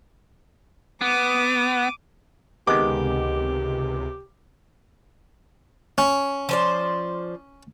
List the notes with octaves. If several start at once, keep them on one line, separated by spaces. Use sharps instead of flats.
B3 D6 D#7
C#2 C3 D#3 G#3 B3 G4 D6
C#4
F3 C5 D5